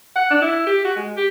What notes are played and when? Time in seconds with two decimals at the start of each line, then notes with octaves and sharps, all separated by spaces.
0.16 F#5
0.31 D4
0.42 E4
0.66 G4
0.85 F#4
0.96 G#3
1.17 G4